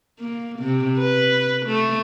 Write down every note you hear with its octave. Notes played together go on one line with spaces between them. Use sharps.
A#3
C3
B4
A3